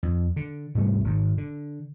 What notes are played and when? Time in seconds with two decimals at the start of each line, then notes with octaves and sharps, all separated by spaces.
0.03 F2
0.36 D3
0.75 G#2 C3 G3 A3
1.04 G#1 G#2
1.38 D3